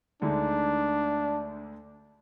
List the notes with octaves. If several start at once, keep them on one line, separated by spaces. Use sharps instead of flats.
D2 D3 G#3 D4 D#4